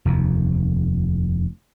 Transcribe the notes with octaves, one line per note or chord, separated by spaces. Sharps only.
F1 D#2